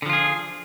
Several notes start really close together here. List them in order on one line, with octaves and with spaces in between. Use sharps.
D3 F3 F4 G#4